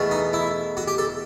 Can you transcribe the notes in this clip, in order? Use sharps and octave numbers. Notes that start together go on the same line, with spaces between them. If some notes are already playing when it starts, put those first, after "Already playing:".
Already playing: E2 B2 A3
D#4
E4
F#4
G4
A4